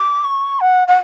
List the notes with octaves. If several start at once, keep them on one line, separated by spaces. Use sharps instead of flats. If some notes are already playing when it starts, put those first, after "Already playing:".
Already playing: D6
C#6
F#5
F#5